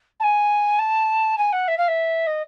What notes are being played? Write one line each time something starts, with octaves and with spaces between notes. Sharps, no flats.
A5
G#5
A5
G#5
F#5
E5
F5
E5
D#5